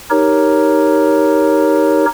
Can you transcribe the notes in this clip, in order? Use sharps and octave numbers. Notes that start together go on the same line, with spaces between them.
D#4 G4 A#4 C#5